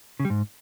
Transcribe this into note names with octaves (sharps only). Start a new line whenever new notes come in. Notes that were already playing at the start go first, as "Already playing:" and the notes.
C#3
G3
G#2